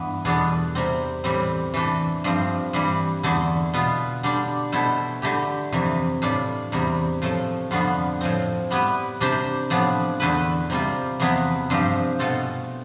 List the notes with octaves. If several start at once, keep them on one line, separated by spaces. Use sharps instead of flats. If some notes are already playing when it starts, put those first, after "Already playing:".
Already playing: G2 E3 B3
E2 B2 B3 D4 A4
C3 G3 C4
A2 E3 G3 C4
E3 A3 D4 A4
G2 F3 C4
G2 E3 G3
E2 D3 A3 E4
B2 B3 F4
D3 G3 D4
B2 A3 E4 A4 C5
D3 A3 E4 G4
F2 C3 E3
A2 G3 D4 F4
E2 C3 G3
A2 F3 A3
F2 D3 G3 B3 F4
A2 F3 C4
G3 B3 E4 B4
C3 G3 D4 G4 C5
A2 F3 B3 D4
E2 D3 A3 E4 B4
C3 G3 C4 F4
E2 C3 F3 B3 E4
G2 F3 C4 G4
B2 A3 C4 F4 A4